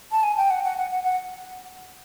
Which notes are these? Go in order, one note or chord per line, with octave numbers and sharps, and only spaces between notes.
A5
G#5
G5
F#5
F#5
F#5
F#5
F#5